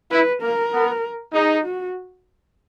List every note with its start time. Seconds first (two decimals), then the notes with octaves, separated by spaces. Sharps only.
0.11 E4 B4
0.42 A#3 A#4
0.72 B3
1.33 D#4 G#4
1.65 F#4